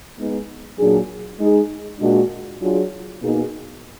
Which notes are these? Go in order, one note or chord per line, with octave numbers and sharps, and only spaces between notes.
G#3 B3 D#4
A#2 F#3 D4 G#4
G#3 D#4 G#4
A#2 G#3 D4 F#4
F#3 D4 F4 G#4
B2 A#3 D#4 G#4